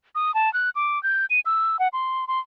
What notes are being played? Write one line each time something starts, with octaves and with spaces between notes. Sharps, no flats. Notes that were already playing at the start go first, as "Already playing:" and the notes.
D#6
A5
F#6
D6
G6
D#7
E6
F#5
C6
C6